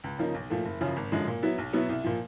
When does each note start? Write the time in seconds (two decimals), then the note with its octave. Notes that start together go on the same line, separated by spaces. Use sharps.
0.04 C#2
0.19 C#3 F3 A#3 D#4
0.34 B1
0.50 A#2 F3 A3
0.65 F#1
0.81 F#2 C#3 F3
0.96 G#1
1.12 F#2 D3 F3 G#3
1.27 A#2
1.43 F#3 B3 E4
1.58 B1
1.73 B2 F#3 B3 E4
1.89 C2
2.04 A#2 F3